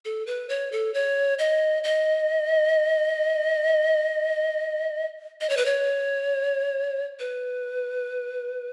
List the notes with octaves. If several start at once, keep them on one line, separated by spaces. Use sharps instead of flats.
A4
B4
C#5
A4
C#5
D#5
D#5
D#5
C#5
B4
C#5
B4